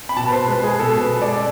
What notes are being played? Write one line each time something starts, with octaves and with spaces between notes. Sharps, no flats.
B5
B2 A5
B4
C5
G#3 B4
G#4
B2 A4
B4
G#3
D5